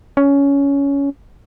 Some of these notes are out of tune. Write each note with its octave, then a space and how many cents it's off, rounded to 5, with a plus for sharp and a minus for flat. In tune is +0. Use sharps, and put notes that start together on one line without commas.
C#4 +15